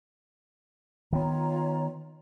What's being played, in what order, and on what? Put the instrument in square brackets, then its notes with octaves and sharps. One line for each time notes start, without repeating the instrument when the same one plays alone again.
[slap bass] D#3 B3 [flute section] F4 C#5 A#5